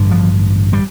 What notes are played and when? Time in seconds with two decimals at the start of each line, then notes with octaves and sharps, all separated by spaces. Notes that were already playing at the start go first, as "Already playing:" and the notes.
Already playing: A1 G2 D3
0.11 F3
0.73 G3